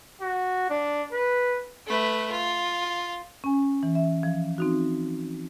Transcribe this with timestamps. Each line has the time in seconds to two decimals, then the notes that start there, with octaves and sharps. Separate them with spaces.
0.21 F#4
0.70 D4
1.13 B4
1.87 A3 B4
2.32 F4
3.44 C#4 G#5
3.83 E3
3.95 E5
4.23 F3
4.58 C4 D#4 F#4